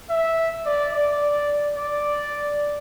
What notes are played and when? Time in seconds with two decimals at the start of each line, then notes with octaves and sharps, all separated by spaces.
0.10 E5
0.66 D5
0.93 D5
1.77 D5